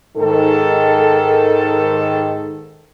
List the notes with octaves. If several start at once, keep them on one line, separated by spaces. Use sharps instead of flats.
G#2 D#3 A4